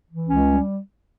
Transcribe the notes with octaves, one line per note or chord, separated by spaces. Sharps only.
E3
C#2 C#4
G3